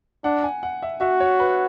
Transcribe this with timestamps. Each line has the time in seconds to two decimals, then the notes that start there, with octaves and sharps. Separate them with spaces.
0.24 D4 F#5
0.43 G#5
0.63 F#5
0.82 E5
1.01 F#4 E5
1.20 C#5
1.40 B4